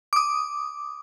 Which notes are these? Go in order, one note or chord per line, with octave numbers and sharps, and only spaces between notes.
D6 D#6